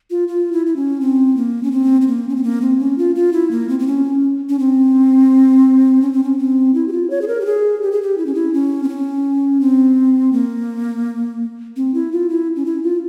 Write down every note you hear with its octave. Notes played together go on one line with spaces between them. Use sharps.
F4
F4
E4
E4
C#4
C4
A#3
C#4
C4
C4
A#3
C#4
C4
A#3
C4
C#4
F4
F4
E4
A#3
C4
C4
C#4
C#4
C4
C#4
C4
C#4
C4
E4
G4
F4
C#5
G#4
A#4
G4
G#4
G4
G#4
G4
E4
C#4
E4
C#4
C4
C#4
C4
A#3
C4
E4
F4
E4
C#4
E4
F4